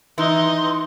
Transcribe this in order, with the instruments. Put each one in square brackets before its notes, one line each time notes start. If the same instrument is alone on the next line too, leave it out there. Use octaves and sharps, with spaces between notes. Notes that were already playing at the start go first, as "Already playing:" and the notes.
[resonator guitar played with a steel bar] E3 [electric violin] D#4 D#5 [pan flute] C6